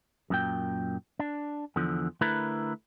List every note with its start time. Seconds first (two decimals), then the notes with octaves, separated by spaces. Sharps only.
0.30 F#2 A#2 G5
1.19 D4
1.76 E2 D3 F3
2.21 D3 A3 E4 A#4 B4